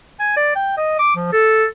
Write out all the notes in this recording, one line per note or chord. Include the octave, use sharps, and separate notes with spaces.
G#5
D5
G5
D#5
D6
F3
A4